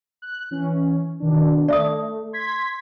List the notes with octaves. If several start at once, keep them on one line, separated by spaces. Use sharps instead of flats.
F#6
E3 C#4
B2 D#3 D4
A3 D5 E5 D#6
C6 G#6 B6